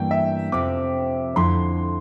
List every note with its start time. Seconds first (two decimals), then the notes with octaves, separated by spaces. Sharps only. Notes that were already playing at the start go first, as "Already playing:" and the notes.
Already playing: G2 E3 G3 A#3 G5
0.11 E5
0.52 F2 C3 F3 C4 D6
1.36 F2 D3 A3 E4 C6